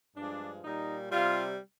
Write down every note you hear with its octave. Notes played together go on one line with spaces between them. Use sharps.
G2 F3 G#3 D4
A#2 G3 D#4
C3 G3 F4